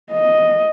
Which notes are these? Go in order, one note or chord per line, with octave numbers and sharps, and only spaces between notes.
D#5